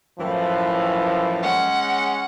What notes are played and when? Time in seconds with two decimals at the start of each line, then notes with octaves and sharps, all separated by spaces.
0.19 F#2 A2 E3 F3
1.43 G#3 C#4 F#5